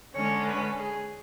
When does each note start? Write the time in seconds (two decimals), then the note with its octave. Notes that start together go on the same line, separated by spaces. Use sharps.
0.14 D3 G#3 C#4 C#5
0.46 B4
0.79 G#4